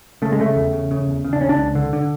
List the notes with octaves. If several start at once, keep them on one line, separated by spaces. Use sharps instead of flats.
C#3 A3
G#3
C#3 A3
E2
C#3
C#3
E2
C#3
D4
C#3 C#4
D4
C#2
D3
D3